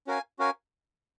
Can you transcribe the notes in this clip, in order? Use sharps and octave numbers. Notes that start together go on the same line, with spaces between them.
C#4 F#4 A#4 F5 G#5
C#4 F#4 A#4 F5 G#5